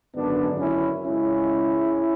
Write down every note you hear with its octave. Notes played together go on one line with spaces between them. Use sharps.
G#1 F#2 D3 B3 D4
C#4 E4
C#2 C#3 G#3 C#4 E4